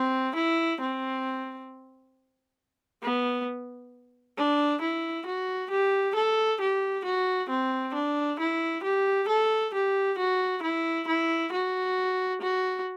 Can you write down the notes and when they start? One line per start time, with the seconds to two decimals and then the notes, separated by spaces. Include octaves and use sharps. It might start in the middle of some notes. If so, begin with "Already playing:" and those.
Already playing: C4
0.36 E4
0.81 C4
3.03 B3
4.37 D4
4.82 E4
5.26 F#4
5.71 G4
6.15 A4
6.61 G4
7.05 F#4
7.49 C4
7.94 D4
8.40 E4
8.83 G4
9.28 A4
9.74 G4
10.19 F#4
10.63 E4
11.08 E4
11.53 F#4
12.41 F#4